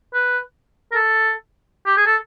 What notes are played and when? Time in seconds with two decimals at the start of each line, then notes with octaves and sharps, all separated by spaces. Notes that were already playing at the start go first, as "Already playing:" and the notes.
0.14 B4
0.92 A#4
0.95 A4
1.86 G4
1.97 G#4
2.06 A4